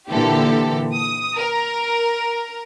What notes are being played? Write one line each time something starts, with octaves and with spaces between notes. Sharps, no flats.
A#2 D3 E3 G4 A4
D#6
A#4